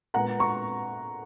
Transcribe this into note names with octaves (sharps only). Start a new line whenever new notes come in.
A#2 G#3 B3 F#5 A#5
A#5 C#6